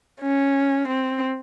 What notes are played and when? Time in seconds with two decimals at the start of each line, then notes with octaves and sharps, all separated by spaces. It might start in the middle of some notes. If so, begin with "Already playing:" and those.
0.21 C#4
0.88 C4